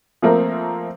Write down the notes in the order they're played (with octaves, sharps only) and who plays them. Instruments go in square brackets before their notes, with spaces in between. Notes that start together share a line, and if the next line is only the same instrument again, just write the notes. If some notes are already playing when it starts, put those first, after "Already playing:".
[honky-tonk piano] F3 A3 A#3 C4 A#4